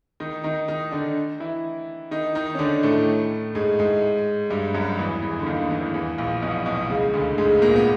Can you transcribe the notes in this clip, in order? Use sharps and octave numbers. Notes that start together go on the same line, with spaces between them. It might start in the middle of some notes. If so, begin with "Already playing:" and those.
D#3 D#4
D#3 D#4
D#3 D#4
D3 D4
E3 E4
D#3 D#4
D#3 D#4
C#4
D3 D4
A2 A3
G#2 G#3
G#2 G#3
G2 G3
F#2 F#3
E2 E3
E2 E3
D3
D#2 D#3
E2 E3
E2 E3
A#1 A#2
B1 B2
B1 B2
C#2 C#3
D2 D3
G#2 G#3
A#2 A#3
B3